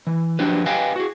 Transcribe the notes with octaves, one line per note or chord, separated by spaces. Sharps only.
E3
F3 F#3 D4 G4 B4
G4 B4 D#5 F5 G5 G#5
F#4 G#4